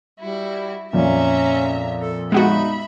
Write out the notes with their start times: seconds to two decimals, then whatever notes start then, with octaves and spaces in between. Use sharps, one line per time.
0.20 G3 E4 F#4
0.93 F2 A#2 C#4 E5 A#5
1.97 A4
2.32 G#3 B3 D#4 F#4 E5 B5